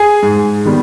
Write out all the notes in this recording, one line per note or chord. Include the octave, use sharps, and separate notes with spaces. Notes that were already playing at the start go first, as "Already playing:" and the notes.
Already playing: G#4 G#5
G#2
D#3 G3 B3